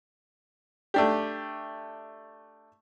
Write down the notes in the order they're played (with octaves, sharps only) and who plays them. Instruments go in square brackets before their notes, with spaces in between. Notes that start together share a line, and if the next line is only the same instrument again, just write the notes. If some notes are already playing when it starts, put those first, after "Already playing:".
[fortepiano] A3 D4 G4